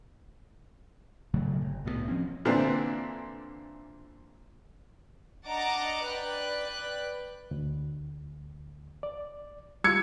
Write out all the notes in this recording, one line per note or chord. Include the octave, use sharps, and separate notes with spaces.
A#2 C#3 F#3 A3
G1
C2 A2 E3 B3
F3 C4 C#4
A#2 D3 E3 C4 D4
D4 D#5 F#5 A5 A#5 D6
B4 D5 G5 F#6
D2
D5
G3 F4 E6 G#6 C#7